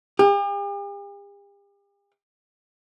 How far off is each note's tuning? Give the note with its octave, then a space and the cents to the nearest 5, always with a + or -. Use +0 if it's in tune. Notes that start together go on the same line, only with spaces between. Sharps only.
G4 +45